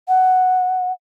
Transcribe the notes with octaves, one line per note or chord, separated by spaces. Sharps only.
F#5